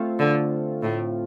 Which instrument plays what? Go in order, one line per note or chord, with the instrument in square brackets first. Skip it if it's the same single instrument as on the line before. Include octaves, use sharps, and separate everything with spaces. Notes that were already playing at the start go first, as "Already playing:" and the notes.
Already playing: [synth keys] A3 C4 F4
[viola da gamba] D3
A2